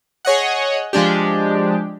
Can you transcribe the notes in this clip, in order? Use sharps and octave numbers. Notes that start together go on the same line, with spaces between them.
G#4 C#5 D#5 F#5
F3 G#3 D4 G4